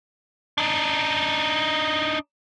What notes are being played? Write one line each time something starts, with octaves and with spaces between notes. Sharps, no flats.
D4 D#4